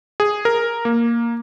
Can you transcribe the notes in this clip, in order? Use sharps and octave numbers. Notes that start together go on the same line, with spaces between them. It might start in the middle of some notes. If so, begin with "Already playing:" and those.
G#4
A#4
A#3